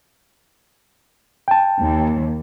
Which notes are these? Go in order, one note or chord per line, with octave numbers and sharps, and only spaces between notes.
G5 A5
D#2